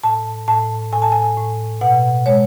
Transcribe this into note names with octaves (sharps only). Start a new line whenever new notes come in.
A2 A5
A2 A5
A2 G#5
A5
G#5
A2
B2 F#5
G#3 C#5